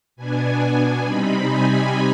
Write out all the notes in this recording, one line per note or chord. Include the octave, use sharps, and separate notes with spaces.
B2 B3 D4 G#5
C3 G3 C4 D#4 B5
G#5